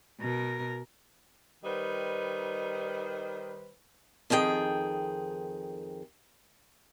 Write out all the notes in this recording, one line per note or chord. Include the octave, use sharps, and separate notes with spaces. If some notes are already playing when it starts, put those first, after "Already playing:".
B2 A#4
D#3 G3 D#4 B4 C5
F2 D#3 G#4 G5